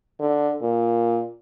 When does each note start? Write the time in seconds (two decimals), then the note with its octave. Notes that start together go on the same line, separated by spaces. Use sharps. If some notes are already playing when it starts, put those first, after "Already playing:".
0.20 D3
0.61 A#2